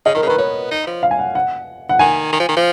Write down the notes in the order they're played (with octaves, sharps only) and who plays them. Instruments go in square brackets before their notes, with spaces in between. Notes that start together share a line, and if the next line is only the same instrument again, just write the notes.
[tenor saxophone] C#3 [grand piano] D#5
[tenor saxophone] D#3 [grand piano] A#4
[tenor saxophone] C#3
[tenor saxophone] D#3 [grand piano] B4
[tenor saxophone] B3 [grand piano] C#5
[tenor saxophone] D#4
F3
[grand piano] F5
G#5
F#5
F#5
F#5
[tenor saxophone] D#3 [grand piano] G#5
[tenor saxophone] D#3
F3
D#3
F3